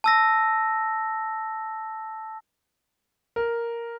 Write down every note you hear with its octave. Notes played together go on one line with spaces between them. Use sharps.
A5 E6 A#6
A#4